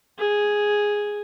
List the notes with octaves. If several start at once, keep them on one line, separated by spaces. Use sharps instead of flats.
G#4